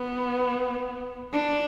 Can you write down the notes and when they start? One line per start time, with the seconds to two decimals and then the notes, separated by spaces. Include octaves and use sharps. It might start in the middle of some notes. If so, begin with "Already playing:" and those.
Already playing: B3
1.33 D4